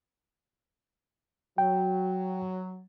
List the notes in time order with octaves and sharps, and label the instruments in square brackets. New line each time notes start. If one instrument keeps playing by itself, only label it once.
[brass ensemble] F#3 [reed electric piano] G5